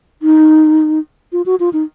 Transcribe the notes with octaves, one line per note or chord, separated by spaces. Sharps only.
D#4
F4
F#4
F4
D#4